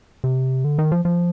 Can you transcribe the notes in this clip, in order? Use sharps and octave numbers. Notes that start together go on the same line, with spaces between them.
C3
D3
D#3
F3
F3